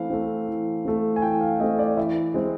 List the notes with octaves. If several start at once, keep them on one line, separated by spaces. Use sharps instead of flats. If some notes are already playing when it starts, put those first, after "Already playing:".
Already playing: E3 A3 C4 F5
A3 C4
E3
A3 C4
G#5
E3 G5
F5
A3 C4 D#5
D5
E3 E5
G#3 C4